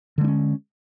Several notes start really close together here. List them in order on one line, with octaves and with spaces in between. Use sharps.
D3 G#3 D4 C#4